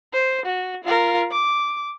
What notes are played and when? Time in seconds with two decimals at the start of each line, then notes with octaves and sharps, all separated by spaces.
0.14 C5
0.46 F#4
0.84 F4 A#4
1.31 D6